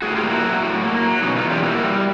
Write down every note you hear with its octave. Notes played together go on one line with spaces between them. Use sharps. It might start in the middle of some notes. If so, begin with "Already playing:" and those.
A2 F#4 G#4
F4 G4
A#3
E4 F#4
F#3
A2
A#3
F#3
B2 C#4 D#4
D#4 F4
E2
F4 G4
A#3 E4 F#4
G3